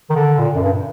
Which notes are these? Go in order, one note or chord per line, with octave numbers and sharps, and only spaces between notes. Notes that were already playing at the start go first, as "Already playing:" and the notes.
D#3
D3
A#2
F#2
G2